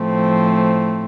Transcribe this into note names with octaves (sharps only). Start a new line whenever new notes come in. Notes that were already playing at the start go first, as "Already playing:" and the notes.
Already playing: A2 F3 A3 C4